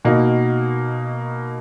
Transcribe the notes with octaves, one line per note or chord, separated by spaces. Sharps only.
B2 A#3 D#4 F#4